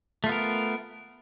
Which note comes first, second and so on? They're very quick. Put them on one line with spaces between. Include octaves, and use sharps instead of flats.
A3 F4 B3 A#4